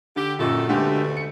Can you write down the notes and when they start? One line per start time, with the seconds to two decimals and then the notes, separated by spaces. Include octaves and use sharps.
0.16 D3 G4
0.39 F#2 A#2 D#3 F#4 A4
0.69 D2 B2 D3 G#3 A3 G4
1.17 C#7